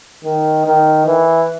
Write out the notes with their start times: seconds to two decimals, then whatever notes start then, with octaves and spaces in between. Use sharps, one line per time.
0.24 D#3
0.65 D#3
1.06 E3